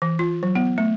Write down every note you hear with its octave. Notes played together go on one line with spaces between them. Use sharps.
E3
F4
F#3
B3
A3